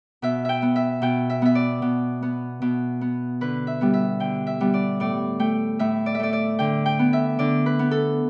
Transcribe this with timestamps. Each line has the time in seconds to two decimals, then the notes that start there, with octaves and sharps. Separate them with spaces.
0.22 B2 E5
0.45 E5 G5
0.62 B3
0.76 E5
1.02 B2 G5
1.30 E5
1.42 B3 E5
1.55 D5
1.82 B2
2.22 B3
2.62 B2
3.01 B3
3.41 D3 B4
3.67 E5
3.81 G3 B3
3.94 E5
4.20 D3 G5
4.47 E5
4.61 G3 B3
4.74 D5
5.00 A2 D5
5.39 A3 G5
5.79 A2 E5
6.06 D5
6.15 E5
6.20 A3 D5
6.33 D5
6.59 D3 G5
6.86 G5
6.99 B3
7.13 E5
7.39 D3 D5
7.66 B4
7.79 B3
7.91 A4